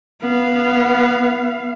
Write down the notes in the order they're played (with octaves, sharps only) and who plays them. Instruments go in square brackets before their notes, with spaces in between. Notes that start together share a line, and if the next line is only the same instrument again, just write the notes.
[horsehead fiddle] B3 F5